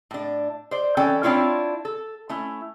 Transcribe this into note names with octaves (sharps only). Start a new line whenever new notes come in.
A2 D4
C5 D5
E3 C#4 A4 D5 G5
C4 D4 E4 F4 C#5
A4
A3 C#4 E4